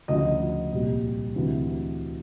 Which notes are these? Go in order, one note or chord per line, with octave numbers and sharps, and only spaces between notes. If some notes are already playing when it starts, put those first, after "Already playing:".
D2 C#3 F3 D#5
C2 A#2 G3
D2 C3 E3